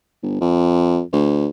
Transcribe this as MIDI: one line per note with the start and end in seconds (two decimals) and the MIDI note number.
0.23 0.40 31
0.41 1.01 41
1.12 1.48 38